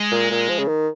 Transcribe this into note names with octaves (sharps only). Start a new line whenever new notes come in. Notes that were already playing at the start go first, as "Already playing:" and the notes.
Already playing: G#3
A#2
A#2
F3
C#3
D#3